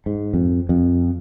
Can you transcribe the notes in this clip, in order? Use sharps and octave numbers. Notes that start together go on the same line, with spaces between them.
G#2
F2
F2